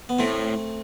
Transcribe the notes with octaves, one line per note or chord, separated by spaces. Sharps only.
B3
A2 A3 C4